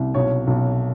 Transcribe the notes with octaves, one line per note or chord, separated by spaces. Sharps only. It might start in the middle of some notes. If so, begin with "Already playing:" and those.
Already playing: C2
B1 C#5
B1